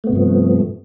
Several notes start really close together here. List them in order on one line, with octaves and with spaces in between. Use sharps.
A3 B3 C3 G2 F3